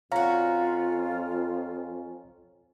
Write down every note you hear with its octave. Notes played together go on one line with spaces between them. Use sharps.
F2 C#4 F4 F#4 F5 A#5